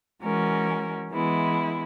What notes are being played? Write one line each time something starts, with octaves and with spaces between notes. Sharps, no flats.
E3 G#3 C#4 F#4 A#4
E3 G#3 B3 E4